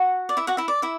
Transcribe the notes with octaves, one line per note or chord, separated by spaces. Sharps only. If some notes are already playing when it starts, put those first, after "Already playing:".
Already playing: F#4 F#5
D5
E4 E5
F#4 F#5
E4 E5
D5
E4 E5